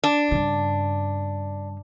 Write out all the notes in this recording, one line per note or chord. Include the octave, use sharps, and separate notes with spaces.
D4
G2 C#3